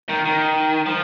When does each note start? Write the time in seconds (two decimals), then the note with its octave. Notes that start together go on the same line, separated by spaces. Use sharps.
0.09 D#3
0.25 D#3
0.86 F3